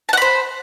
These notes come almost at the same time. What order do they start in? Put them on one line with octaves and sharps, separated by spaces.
A5 F#5 B5 C5